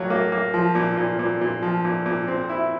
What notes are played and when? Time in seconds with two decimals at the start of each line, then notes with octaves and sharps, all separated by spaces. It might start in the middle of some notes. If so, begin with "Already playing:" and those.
Already playing: A2 F#3 A#3
0.10 A#3
0.32 A#3
0.54 F3
0.75 A#2
0.97 A#2
1.19 A#2
1.41 A#2
1.62 F3
1.85 A#2
2.06 A#2
2.28 C4
2.49 E4